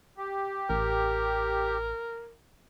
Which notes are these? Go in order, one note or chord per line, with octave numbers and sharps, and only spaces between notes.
G4
A1 A#4